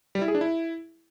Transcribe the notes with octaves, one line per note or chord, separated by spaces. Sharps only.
G3
E4
G#4
D4
E4